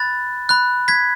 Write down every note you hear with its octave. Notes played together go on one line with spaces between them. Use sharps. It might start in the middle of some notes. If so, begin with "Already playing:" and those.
Already playing: B5 F#6 A6
B5 F#6
G#6 B6